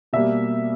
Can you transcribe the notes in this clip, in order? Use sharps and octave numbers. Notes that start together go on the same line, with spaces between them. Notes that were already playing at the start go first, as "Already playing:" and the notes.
B2 G3 A#3 E5